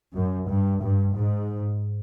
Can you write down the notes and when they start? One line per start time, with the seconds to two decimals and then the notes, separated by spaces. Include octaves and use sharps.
0.14 F#2
0.48 G2
0.81 G2
1.14 G#2